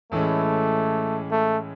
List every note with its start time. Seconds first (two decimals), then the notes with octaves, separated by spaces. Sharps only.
0.12 A2 E3 G#3 A3 C#4
1.31 A3